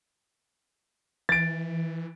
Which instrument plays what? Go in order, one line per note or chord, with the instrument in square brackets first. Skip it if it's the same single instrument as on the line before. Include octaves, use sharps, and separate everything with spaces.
[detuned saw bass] E3 [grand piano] A6 D7